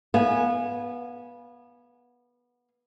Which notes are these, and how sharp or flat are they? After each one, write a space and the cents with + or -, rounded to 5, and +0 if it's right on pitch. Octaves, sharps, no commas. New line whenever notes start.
B3 -20 F5 +0 G#5 +0